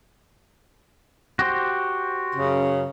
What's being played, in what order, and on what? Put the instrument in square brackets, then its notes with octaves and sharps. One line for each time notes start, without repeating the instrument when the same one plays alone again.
[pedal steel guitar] F#4 G4 C5
[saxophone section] F#2 C#3